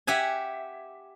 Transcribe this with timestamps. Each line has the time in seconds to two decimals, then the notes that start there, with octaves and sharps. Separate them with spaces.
0.07 G4 E5 F#5 G#5